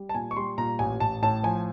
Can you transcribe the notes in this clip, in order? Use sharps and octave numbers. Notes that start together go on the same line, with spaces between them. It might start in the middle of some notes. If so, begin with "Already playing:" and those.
Already playing: G3
A5
A#2 G#5
C#6
G3 C6
A#2 A#5
A1 G#5
A1 A5
A2 A5
F3 G#5